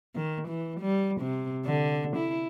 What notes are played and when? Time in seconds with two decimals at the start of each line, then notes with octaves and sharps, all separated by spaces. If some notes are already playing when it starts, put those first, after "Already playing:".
0.15 D#3
0.48 E3
0.81 G3
1.21 C3
1.65 D3
2.16 E4